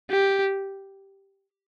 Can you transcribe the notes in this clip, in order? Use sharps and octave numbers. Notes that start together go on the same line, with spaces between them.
G4